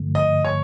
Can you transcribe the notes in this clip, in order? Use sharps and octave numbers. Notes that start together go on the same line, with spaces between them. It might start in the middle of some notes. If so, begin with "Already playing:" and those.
Already playing: G2 D3 F3 A3
D#5
C#5